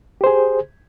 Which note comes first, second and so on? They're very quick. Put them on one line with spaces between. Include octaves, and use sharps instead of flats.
G4 C5 G#4